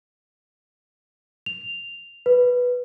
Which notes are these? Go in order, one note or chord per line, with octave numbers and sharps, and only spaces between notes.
F7
B4